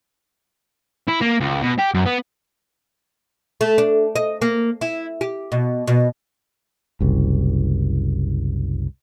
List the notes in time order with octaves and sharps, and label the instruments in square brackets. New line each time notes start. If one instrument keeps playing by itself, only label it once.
[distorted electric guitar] E4
A#3
C#2
B2
G4
F#2
B3
[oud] A3
D4
D#5
A#3
E4
G4
B2
B2
[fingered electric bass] F#1 C2